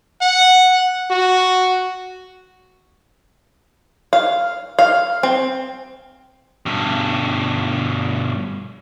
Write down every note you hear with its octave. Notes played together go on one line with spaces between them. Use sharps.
F#5
F#4
F5
F5
C4
G2 B2